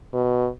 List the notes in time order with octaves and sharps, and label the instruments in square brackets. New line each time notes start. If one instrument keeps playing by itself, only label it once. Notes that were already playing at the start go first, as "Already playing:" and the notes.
[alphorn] B2